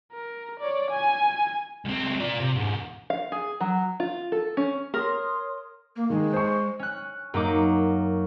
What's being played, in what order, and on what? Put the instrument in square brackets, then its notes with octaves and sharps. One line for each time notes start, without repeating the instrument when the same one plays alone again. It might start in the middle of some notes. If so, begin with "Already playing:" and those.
[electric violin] A#4
C#5 D5
G#5
[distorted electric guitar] C#2 C4
F4 D5
C3
E2 G#2
[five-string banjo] F5
G#4
F#3
F4
A4
C#4
[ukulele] A#4 [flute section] C#5 C6 D#6
[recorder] A#3
[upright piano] D#3 [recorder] G#3
[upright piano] C5 C#6
[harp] C#4 F#6
F#2 A#3 D#4 D6